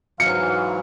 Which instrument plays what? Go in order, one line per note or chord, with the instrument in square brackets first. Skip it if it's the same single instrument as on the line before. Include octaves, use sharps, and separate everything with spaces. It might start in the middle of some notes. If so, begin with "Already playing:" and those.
[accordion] G#2 E3 F#3 [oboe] F5 [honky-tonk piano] C#7